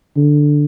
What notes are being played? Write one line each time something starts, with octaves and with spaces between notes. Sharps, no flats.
D3